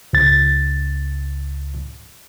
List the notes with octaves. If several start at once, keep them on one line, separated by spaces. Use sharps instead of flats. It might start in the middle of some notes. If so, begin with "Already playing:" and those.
C#2 A6